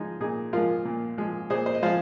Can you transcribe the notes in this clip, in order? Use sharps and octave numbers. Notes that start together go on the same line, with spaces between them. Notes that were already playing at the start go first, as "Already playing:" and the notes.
Already playing: F3 G#3 D#4 G#4
A#2 D#4 G#4
F3 G#3 F4 A#4
A#2
F3 G#3
A#2 G#4 C5
C5
D#5
F3 G#3 C5 F5